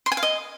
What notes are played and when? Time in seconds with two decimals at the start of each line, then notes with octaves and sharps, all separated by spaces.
0.06 C6
0.12 G#5
0.17 F5
0.23 D#5